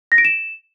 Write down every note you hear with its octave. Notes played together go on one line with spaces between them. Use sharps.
A#6
D7
E7